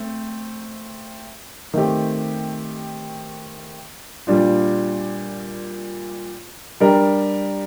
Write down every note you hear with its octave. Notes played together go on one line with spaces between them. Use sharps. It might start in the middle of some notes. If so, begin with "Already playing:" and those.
Already playing: A3 C4
D#3 A3 C4 G4
A#2 G3 D4 F4
G3 D4 G4 A#4